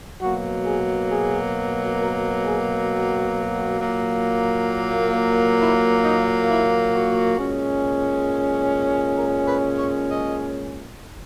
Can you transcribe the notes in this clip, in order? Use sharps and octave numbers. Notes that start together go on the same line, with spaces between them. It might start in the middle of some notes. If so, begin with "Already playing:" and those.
B2 F#3 A#3 F#4
G#4
G#4
A#4
G#4
F#4
A#2 F#3 A#3
E4
D#4
E4
F#4
A#2 G#3 C#4
A#4
B4
C#5
D#5